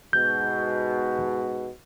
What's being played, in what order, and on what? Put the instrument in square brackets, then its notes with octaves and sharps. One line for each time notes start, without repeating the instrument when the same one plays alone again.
[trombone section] G#2 B2 [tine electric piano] G6